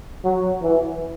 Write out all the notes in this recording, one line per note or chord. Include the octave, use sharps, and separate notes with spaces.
F#3
E3